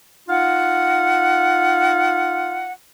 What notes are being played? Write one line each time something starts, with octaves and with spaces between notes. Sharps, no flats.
D#4 F4 F5 F#5